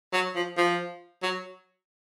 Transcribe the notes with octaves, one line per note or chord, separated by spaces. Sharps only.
F#3
F3
F3
F#3